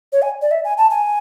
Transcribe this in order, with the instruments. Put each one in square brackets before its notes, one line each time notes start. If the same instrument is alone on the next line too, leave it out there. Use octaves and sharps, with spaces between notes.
[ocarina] C#5
G#5
D5
E5
G#5
A5
G#5